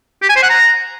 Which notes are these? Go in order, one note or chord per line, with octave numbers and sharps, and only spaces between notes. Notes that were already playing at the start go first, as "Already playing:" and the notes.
G4
G#5
C5
F#5
A#5